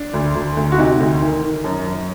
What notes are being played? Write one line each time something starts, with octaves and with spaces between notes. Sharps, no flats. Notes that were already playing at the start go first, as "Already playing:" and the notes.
Already playing: D4
D2
D2
D2
F#4
C3 D#4
D2
D#3
D#3
F#2
F#2